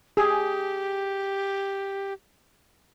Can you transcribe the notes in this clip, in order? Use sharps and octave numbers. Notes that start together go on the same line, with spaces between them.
G4 G#4